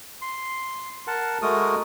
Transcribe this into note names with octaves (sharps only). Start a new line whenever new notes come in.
C6
A#4 F#5 A5
G#3 A3 F#4 A#4 D#6